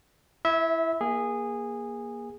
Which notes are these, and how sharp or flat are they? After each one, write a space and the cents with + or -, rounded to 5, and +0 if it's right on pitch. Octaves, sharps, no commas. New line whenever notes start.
E4 +10 E5 -20
A#3 +20 G#4 -15